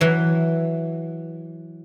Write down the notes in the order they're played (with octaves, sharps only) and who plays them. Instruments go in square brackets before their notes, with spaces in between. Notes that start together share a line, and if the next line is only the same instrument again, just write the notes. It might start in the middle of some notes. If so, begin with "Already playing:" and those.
[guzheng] E3 F#3